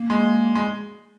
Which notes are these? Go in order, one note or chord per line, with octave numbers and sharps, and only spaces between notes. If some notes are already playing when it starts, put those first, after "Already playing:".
Already playing: A#3
G#3
G#3